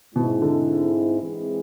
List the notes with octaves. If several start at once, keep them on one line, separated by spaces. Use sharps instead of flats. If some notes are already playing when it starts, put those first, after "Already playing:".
G#2 B2 G#3 C4 E4
D3
E3 G#3 C4 G#4